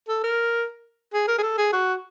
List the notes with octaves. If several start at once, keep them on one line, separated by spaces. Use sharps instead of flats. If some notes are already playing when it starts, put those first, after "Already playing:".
A4
A#4
G#4
A#4
G#4
A4
G#4
F#4